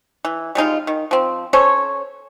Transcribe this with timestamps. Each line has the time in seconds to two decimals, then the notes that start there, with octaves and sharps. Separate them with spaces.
0.25 E3
0.55 G3 G#3 D#4 F4
0.87 D#3
1.11 F3 C4
1.53 C#4 A4 C5 C#5